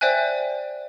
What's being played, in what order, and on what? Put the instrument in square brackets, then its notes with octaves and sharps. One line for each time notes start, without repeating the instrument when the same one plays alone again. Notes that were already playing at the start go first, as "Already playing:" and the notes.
[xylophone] C5 D5 E5 G5 G#5 F#6